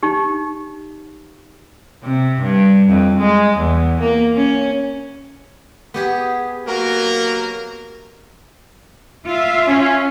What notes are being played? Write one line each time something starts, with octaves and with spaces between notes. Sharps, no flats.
D#4 G4
C3
G2
F2
G#3
E2
A#3
C#4
B3 G4 G#4
F#3 A#3 A#4
F4 E5
C#4